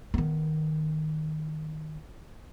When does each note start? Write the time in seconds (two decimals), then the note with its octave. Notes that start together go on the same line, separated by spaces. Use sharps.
0.14 D#3 B3